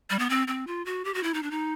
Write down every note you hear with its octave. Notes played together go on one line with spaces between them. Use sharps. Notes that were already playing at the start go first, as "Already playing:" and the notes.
G3
B3
C4
C4
F4
F#4
G4
F#4
E4
D#4
D4
D#4